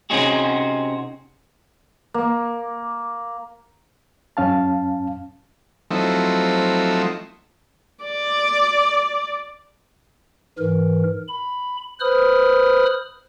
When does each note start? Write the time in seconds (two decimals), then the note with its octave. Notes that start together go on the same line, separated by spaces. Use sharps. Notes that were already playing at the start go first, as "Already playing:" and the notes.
0.10 C3 C4 C#4 D#4 F#4 G#4
2.14 A#3
4.37 F#2 C#4 F5 A5
5.91 F3 F#3 A3 C4 D#4 E4
8.04 D5
10.58 G#2 E3 A#4
11.28 B5
12.00 B4 C5 B5 D#6 F6